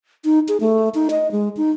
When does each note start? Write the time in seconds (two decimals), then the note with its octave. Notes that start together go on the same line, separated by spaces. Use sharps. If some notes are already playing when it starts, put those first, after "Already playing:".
0.25 D#4
0.48 G#4
0.60 A3
0.95 D#4
1.10 D#5
1.32 G#3
1.57 D#4